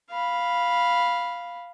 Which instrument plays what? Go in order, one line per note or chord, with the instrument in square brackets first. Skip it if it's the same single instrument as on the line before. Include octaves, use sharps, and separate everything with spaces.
[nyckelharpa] F5 B5